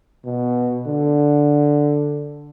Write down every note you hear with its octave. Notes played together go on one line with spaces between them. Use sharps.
B2
D3